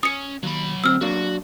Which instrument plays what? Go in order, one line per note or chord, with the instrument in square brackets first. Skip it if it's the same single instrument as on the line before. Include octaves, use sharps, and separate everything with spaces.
[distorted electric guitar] C#4 [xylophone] D#6 C#7
[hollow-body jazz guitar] D#2 [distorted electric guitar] F#3 B5
[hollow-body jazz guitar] D2 C4 [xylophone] E6 F6
[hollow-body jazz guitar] F#3 A#3 D4 [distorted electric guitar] F#4